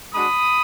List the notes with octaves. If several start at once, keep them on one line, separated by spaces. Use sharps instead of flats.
G#3 D4 F#4 B5 D#6